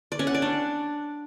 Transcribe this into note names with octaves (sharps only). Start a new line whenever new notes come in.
D5
C#4
F#5
D5
D4